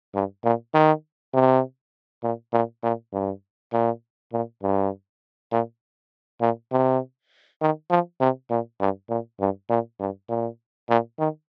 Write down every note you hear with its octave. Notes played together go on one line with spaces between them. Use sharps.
G2
A#2
D#3
C3
A#2
A#2
A#2
G2
A#2
A#2
G2
A#2
A#2
C3
D#3
F3
C3
A#2
G2
A#2
G2
A#2
G2
A#2
A#2
D#3